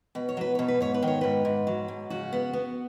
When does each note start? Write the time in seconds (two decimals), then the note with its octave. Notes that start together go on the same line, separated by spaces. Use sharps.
0.15 B2 B4
0.29 C#5
0.37 F#3 B4
0.55 B2 C#5
0.68 B4
0.80 G#2 C#5
0.94 B4
1.02 D#3 C#5
1.21 G#2 B4
1.45 G#2
1.67 F#3
1.88 G#2
2.10 C#3 F#4
2.33 B3
2.53 B3